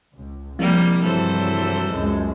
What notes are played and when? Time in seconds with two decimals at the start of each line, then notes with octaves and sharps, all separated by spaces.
0.16 C#2
0.59 C2 F3 G3 G#3 A#3
1.02 G2 E3 F#3 A4 C5
1.89 C#2 F#2 G#3